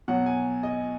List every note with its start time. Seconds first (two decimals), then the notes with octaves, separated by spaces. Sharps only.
0.08 B2 F#3 F#5
0.26 G#5
0.63 D#5